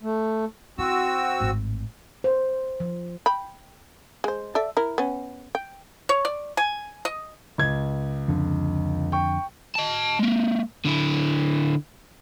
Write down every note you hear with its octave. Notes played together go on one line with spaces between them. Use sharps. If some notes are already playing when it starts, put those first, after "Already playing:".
A3
C4 E4 F#4 E6
G#1 A2
C5
F3
G5 B5
G#3 C5
A4 D5 E5
E4 A#4
B3 C#4
G5
C#5
D5
G#5
D#5
C#2 G#6
F2 D3
G5 C#6
D#5 A5
G#3 A#3
D3 E4